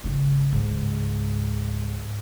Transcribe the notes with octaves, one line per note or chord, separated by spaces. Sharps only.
G#1 C#3
C#2 G#2